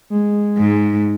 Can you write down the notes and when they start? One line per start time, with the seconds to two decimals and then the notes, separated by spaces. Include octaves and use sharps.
0.10 G#3
0.58 G#2